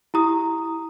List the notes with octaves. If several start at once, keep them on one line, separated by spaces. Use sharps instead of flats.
E4 G4 A#5 D#6